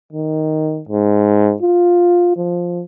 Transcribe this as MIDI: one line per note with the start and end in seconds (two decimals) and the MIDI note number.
0.13 0.82 51
0.89 1.55 44
1.62 2.34 65
2.37 2.83 53